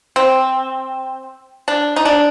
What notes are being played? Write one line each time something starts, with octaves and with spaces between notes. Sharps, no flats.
C4
D4
D#4
D4